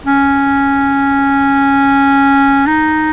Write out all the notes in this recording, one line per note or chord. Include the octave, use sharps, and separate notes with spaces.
C#4
D#4